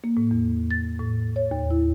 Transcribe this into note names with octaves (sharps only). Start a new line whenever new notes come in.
A#3
A2
E2
A6
A2
C#5
D#2
E4